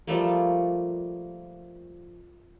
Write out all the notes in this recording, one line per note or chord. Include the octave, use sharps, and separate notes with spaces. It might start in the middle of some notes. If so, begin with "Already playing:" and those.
F3 G3 A3 A#3